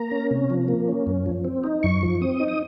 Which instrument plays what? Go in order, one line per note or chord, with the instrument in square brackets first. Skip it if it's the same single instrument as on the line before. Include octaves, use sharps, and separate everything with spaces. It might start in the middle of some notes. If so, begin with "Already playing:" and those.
Already playing: [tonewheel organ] A#3 A#5
C#4
C3
F3
A#3
C#4
F#2
F3
C4
D#4
F#2 C#6
F3
C4 D#6
D#4
D#6